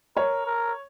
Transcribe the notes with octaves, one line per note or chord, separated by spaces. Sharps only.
A#4 C#5
A#4